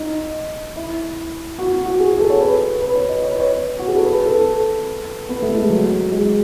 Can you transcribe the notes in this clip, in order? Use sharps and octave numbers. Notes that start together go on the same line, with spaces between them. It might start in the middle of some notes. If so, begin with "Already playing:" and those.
Already playing: D#4
E4
F#4
F#4
F#4
G#4
G#4
A4
C#5
B4
B4
C#5
D#5
C#5
B4
C#5
F#4
G#4
A4
B4
B4
A4
B3
A3
G#3
F#3
G#3